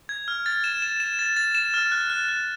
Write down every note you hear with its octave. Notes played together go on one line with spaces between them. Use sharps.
G#6
F6
A6
E7
E7
E7
A6
A6
E7
F6
F#6
F#6
F#6